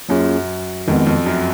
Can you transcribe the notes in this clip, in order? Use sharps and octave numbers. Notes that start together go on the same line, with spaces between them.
F#2 F#3 A#3 C#4 F4 G#4
F2 D#3 G#3 B3
F2
F#2